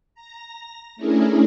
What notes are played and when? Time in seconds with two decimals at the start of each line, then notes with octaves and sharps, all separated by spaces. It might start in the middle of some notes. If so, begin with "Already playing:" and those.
0.14 A#5 A#6
0.96 A3 C#4 D4 E4 G#4 A#4